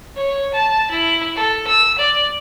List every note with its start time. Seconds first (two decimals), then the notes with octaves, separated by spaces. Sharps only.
0.16 C#5
0.54 A5
0.91 E4
1.36 A4
1.67 E6
1.98 D5